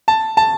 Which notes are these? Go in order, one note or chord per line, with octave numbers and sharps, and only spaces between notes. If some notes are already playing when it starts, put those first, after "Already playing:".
A5
A5